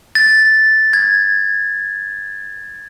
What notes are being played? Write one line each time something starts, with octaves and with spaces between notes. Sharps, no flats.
A6
G#6